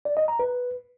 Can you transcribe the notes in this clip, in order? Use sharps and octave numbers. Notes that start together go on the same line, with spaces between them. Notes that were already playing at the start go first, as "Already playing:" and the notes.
D5
D#5
A#5
B4